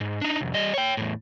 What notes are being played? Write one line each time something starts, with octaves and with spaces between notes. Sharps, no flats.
G#2
D4 D#4
C2 F2
G3 D#5
C#5 G5
E2 A2